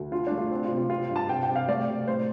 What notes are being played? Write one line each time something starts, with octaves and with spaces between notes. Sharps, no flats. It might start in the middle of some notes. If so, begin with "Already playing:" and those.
Already playing: D2
D3 F4
A3 D4
F4
C4
F4
C3
F4
C4 F4
G2
A5
C3 G5
G5
C3
F5
A3 D5
C3
A2 C5